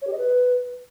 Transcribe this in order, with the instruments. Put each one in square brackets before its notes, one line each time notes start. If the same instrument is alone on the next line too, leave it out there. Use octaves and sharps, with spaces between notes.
[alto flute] C#5
G4
D#5
B4